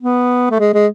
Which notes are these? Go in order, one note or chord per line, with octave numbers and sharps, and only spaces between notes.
B3
A3
G#3
G#3